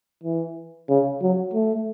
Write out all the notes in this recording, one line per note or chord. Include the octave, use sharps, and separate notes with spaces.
E3
C#3
F#3
A3